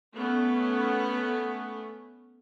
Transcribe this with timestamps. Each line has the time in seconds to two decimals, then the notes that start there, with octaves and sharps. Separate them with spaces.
0.15 A3 B3 C#4